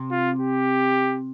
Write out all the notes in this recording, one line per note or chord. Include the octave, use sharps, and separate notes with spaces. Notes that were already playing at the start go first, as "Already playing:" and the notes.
Already playing: C3
F4
G4